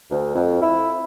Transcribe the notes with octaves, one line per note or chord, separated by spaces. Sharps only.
D2
F2
E4